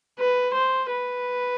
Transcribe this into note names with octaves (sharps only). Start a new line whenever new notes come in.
B4
C5
B4